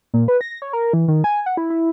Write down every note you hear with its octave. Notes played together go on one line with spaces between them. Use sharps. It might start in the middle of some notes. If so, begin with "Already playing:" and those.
A#2
B4
A#6
C#5
A#4
E3
D#3
G#5
F#5
E4
E4